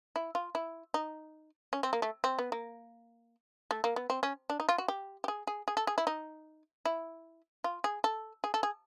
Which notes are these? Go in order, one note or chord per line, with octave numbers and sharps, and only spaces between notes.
E4
F4
E4
D#4
C#4
C4
A#3
A3
C4
B3
A#3
A3
A#3
B3
C4
C#4
D4
D#4
F4
F#4
G4
G4
G#4
G#4
G#4
A4
G#4
E4
D#4
E4
F4
G#4
A4
G#4
A4
G#4